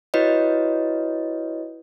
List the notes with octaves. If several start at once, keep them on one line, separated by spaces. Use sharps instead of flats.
E4 F#4 B4 C#5 D#5